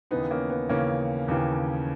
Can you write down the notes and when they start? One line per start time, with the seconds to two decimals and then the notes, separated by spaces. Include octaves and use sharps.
0.11 D#2 C#3 E3 B3 D#4
0.30 A#3 C#4
0.50 B3
0.69 D#2 C#3 E3 A#3 C#4
1.28 D#2 C#3 E3